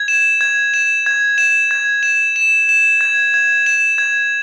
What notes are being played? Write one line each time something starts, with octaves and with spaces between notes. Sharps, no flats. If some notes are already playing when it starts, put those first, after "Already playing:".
Already playing: G#6
E7
G#6
E7
G#6
E7
G#6
E7
E7
E7
G#6
G#6
E7
G#6